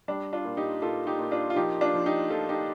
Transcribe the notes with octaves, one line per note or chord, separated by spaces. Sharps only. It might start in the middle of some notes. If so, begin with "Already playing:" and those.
G3 D4
D4 F4
A#2
D#4 G4
A#2 F4 A4
D#4 G4
A#2
D4 F4
F4
F3 D#4 G4
D4 F4
F3
D#4 G4
F3 F4 A4
D#4 G4